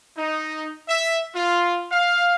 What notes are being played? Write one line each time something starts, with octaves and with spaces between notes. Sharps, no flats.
D#4
E5
F4
F5